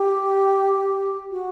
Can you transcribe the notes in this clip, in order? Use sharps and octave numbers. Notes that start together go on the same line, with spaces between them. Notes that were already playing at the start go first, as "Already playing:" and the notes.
Already playing: G4
F#4